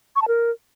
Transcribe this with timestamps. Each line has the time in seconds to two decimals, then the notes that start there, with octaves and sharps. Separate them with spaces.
0.16 C#6
0.22 A5
0.28 A#4